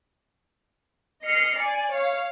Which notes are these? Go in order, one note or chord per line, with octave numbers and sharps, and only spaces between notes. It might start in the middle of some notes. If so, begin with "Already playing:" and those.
D#5 F6 C7 C#7
D5 G#5
C#5 F5